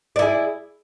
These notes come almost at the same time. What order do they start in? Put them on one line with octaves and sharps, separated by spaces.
D5 E4 G#4